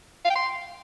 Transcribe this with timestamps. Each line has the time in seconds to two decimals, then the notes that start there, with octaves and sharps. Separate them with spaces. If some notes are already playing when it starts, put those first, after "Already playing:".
0.25 F5
0.30 G5
0.36 C6